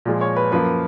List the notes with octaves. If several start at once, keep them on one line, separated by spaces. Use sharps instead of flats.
A#2 F3 G#3
C#5
B4
F#2 F3 A#3 B4